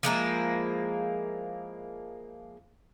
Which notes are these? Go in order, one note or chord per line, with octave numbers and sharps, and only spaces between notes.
F3 G#3 A#3 E4